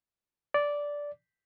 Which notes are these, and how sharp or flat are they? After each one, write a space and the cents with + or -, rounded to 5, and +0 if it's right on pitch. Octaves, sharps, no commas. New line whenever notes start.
D5 -10